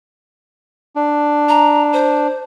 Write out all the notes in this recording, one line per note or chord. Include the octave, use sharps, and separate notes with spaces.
D4
A#5
C5